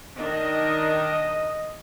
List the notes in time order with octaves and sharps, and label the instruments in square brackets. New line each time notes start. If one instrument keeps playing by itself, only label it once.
[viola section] D#3 D4 [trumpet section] D#5